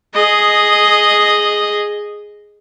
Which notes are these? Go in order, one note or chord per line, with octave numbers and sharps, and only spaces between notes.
G#4 D#5